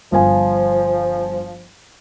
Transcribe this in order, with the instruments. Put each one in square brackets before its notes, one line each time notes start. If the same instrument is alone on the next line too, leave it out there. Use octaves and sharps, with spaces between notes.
[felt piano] G1 F5 G#5 [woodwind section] F3